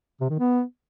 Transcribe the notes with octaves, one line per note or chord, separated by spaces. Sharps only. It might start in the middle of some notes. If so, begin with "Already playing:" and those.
C3
D#3
B3